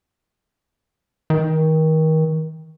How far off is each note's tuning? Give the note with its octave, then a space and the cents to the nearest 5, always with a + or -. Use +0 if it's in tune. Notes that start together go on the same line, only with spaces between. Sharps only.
D#3 +30